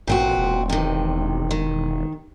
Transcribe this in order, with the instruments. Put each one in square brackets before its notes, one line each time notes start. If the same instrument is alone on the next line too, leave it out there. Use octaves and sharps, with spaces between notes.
[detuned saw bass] A1 [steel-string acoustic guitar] A#2 C4 F#4
[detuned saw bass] E1
[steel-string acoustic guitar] C3 D#3
D#3